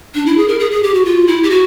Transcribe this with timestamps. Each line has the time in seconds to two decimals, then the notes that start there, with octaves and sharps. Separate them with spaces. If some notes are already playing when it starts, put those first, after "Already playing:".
0.15 D4
0.26 E4
0.37 G#4
0.48 A#4
0.59 G#4
0.71 G#4
0.83 G4
0.94 F#4
1.05 F4
1.27 E4
1.43 G4
1.50 F#4